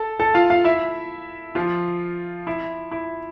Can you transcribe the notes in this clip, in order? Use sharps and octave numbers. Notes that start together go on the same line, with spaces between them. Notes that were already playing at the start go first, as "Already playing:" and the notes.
Already playing: A4 A5
A4 A5
F4 F5
F4 F5
E4 E5
F3 F4
E4
E4